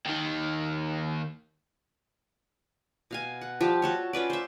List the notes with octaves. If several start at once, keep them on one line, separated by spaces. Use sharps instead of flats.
D#2 D#3
B2 F5 G#5
F#5
F3 G3 G4
F#4 A4 C#5
C#4 F4 B4 D5
C5 E5